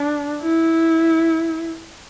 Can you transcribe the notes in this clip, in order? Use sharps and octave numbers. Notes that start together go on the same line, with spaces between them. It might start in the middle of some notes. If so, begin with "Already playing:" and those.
Already playing: D4
E4